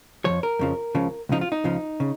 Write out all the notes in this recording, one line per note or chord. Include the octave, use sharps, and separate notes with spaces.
F2 C#3 F3 C#5
A#4
F2 C#3 F3
C#2 C#3 F3
C#2 C#3 F3 D#4
F4
D#4
C#2 C#3 F3
C#3